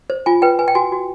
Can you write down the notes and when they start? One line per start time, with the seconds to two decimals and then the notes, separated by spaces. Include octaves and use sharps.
0.10 C5
0.26 F4 G#5
0.42 B4 G5
0.59 B4 G#5
0.68 G5
0.75 F#4 G#5
0.92 F#4